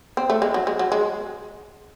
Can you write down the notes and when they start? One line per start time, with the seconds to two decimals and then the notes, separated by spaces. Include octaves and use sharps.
0.17 C4
0.30 A3
0.42 G#3
0.54 F#3
0.67 G#3
0.79 F#3
0.92 G#3